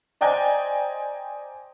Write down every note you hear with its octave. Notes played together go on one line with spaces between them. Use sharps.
C5 D5 D#5 G5 G#5 A#5